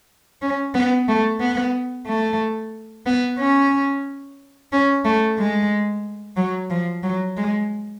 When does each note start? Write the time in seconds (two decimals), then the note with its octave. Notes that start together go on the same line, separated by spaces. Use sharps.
0.42 C#4
0.74 B3
1.08 A3
1.40 B3
2.07 A3
3.06 B3
3.39 C#4
4.72 C#4
5.05 A3
5.38 G#3
6.37 F#3
6.70 F3
7.03 F#3
7.37 G#3